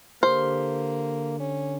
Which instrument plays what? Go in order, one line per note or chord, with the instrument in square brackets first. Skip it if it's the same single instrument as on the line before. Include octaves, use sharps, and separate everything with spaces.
[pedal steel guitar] D3 G4 F6 [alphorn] A#3 [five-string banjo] C5
[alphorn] C#4